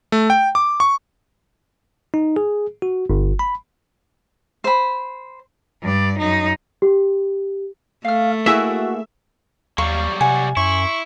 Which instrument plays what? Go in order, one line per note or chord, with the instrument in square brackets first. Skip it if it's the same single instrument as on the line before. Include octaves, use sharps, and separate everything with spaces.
[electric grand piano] A3
G5
D6
C#6
[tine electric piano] D#4
G#4
F#4
G1
B5
[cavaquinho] C5 B5
[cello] G2 D5
F#2 D#4
[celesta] G4
[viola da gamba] A3 [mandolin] F5 F6
[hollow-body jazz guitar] A#3 E4 G#4 [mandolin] F#4 [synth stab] E5
[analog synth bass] D#2 [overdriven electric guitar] F#3 G3 [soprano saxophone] F5 [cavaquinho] C#6
[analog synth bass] C3 [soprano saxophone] F#5 [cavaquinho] G#5
[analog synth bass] F#2 [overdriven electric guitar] E4 [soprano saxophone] C#6